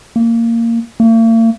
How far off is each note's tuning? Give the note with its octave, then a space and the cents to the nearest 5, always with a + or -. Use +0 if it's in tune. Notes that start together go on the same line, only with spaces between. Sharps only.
A#3 -15
A#3 -45